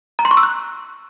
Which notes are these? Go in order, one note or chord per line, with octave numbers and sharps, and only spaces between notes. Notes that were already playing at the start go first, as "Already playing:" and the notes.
A#5
C6
C#6
E6
F#6